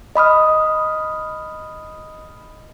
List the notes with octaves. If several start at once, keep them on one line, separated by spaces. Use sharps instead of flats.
D#5 B5 D#6 F6